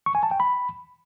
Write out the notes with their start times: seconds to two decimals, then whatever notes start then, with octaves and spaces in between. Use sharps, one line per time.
0.06 C#6
0.15 G#5
0.23 A5
0.31 G5
0.40 B5